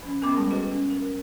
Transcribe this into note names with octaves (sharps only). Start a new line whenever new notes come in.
F3 C#4
B3 C#4 A#4 G5 B5 D6
G3 G#3 G#4 G5 A5
F#4 A4 B4 D#5
C#4 F#4
A#4